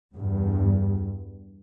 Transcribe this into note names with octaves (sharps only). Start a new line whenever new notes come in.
E2 G2